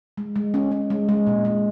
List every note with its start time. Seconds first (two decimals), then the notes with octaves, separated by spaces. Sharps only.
0.18 G#3
0.36 G#3
0.54 C#4
0.72 C#4
0.90 G#3
1.09 G#3
1.27 A#2
1.45 G#3